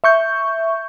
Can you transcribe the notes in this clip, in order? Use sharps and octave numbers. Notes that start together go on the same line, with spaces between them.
E5 C#6 G6